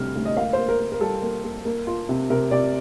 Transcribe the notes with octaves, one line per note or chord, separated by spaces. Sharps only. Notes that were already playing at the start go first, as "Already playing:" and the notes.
Already playing: D2 C3 G3 F6
D2
D#5
A#3 F5
A#3 C5
A#4
A#3
A#4
G3 A4
A#3
A#3
A#3
F4
C3
C3 A#4
C3 D5